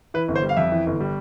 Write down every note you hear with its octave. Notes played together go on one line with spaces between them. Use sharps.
E3 B4
G1
C5
G3
F5
F2 E5
E3
G1
G3